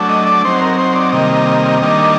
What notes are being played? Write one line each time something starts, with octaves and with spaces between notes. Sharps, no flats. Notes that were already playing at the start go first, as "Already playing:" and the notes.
Already playing: F#3 A3 D4
D#5
D5
F#3 C4 D#4 C5
A#4
C5
D5
C3 D#3 G3 A#3 D#5
D#3 G3 A#3 D4